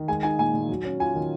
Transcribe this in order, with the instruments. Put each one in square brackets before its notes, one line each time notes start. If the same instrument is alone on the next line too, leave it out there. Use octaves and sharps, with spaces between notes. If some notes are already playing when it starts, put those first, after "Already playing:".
Already playing: [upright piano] D#3
[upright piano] G#3 [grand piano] G#5
[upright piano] D#4 [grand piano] G#5
[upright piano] A#2 [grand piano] G#5
[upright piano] A#2
F#3
C#4
[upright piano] F4 [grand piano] G#5
[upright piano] D#3